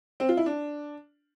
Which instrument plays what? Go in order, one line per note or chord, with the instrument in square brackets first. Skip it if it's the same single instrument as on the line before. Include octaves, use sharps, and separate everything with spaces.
[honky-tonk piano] C4
F4
E4
D4